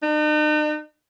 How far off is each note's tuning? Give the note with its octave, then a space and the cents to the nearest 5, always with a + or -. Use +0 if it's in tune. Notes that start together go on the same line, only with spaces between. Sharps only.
D#4 -45